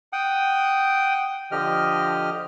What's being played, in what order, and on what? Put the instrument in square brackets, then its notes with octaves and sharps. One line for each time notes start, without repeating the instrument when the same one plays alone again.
[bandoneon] F#5 G5 D#6
D3 F3 G4 D#5 F6